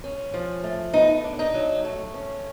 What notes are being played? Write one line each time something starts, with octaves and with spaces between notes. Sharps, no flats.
C#4
F3
A3
B3 D#4
D4
D#4
F#3
A3
C#4